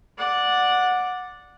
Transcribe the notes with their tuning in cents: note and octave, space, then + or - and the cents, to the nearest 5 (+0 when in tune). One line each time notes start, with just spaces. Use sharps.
D5 +0 F#5 -15